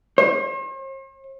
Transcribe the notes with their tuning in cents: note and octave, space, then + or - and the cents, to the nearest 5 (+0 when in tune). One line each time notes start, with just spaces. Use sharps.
C5 +45